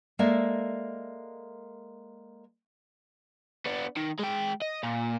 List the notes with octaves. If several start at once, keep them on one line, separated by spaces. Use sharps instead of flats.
G#3 A#3 A4 D5 E5
B3 D4
D#3
G#3 G5
D#5
A#2